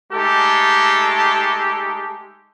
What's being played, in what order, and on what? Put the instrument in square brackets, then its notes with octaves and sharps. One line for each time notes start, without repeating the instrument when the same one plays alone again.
[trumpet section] G#3 A3 D#4 G4 A4